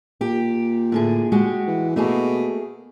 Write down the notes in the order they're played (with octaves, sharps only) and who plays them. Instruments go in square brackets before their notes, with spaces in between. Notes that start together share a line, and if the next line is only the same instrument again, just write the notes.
[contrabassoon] A#2 [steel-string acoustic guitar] G4
[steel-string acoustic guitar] A2 D3 G#4
G#3 F#4 G4
[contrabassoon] E3
[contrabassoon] B2 [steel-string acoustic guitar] A3 A#3 G#4